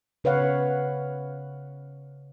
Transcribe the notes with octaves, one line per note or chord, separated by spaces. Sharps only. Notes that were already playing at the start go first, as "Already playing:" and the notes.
C#3 B4 C#5 F5 F#5